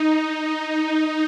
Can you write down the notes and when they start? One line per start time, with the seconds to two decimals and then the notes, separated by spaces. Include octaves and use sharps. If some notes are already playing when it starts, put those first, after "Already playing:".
Already playing: D#4
0.47 D#4